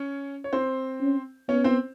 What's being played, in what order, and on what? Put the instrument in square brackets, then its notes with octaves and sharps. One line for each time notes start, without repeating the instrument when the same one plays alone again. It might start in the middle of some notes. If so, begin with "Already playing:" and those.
Already playing: [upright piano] C#4 C#5
C#5
C4 C5
[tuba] C#4
[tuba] B3 [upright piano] C#4 C#5
[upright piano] C4 C5